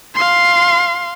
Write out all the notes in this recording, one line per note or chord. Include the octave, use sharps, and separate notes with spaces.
F5 C6